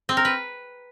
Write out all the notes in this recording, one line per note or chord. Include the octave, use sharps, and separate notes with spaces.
C4
A#4
B4